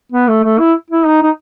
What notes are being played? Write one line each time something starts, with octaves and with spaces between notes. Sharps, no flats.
B3
A3
A3
E4
E4
D#4
D#4